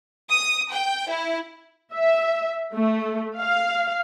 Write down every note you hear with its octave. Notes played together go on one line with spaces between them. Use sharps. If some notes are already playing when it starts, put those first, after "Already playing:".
D#6
G5
E4
E5
A3
F5